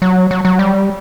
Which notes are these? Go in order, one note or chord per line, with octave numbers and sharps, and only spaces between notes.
F#3
F#3
F#3
G3